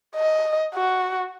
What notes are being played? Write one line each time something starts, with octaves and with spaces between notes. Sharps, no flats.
D#5
F#4